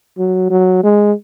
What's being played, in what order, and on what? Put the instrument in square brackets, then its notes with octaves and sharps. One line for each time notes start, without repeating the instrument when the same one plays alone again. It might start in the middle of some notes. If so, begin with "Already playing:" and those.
[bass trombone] F#3
F#3
G#3